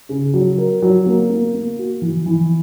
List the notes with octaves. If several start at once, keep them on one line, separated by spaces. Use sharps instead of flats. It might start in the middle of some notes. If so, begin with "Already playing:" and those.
C#3
F#3
A#4
F#3
A#3
A#3
A#3
F#4
E3
E3